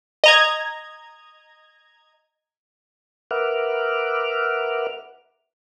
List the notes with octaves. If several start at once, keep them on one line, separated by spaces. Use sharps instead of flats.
D#5 A#5 G#6
A#4 B4 E5 F#5 D6 F6